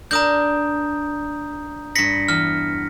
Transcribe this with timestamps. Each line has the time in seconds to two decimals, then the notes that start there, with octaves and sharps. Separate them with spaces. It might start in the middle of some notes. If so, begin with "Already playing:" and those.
0.11 D4 A#4 A#5 D#6 G6
1.95 G2 B5 A#6 B6 C#7
2.28 E2 F6